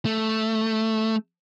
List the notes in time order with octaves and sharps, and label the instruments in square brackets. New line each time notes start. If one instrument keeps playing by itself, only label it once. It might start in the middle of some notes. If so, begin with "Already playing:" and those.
[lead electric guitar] A3